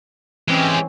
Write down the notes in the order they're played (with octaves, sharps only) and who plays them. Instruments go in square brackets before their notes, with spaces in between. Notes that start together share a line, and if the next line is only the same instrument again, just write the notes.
[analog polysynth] E3 C4 C#4 [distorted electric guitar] G#3 G4